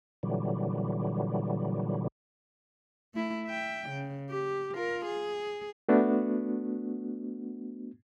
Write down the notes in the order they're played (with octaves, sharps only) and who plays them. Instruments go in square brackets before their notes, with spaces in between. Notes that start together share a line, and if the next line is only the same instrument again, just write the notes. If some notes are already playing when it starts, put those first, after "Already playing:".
[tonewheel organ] A#2 D3 E3 F#3 G3
[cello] A3 E4
E5 G5
C#3
G4
F4 A#4
G#4
[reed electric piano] A3 B3 D4 F#4